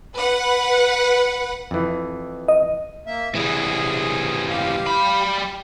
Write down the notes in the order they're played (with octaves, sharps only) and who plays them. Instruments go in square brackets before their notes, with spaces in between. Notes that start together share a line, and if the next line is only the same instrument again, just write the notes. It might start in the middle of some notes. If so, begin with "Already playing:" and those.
[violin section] B4 F#5
[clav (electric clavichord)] F2 E3
[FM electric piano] D#5
[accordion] A#3 E5
[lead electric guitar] E3 G3 [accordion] G#4
[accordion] G4 F5
[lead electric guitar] G3 B5